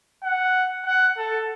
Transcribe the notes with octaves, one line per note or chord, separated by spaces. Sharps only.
F#5
F#5
A4